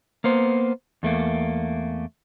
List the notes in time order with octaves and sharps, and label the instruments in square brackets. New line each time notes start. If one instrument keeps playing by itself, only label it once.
[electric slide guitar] A#3 B3 C5
E2 A3 A#3